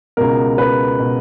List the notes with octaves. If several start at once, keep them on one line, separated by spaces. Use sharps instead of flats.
C#2 B2 A#4
B4
B2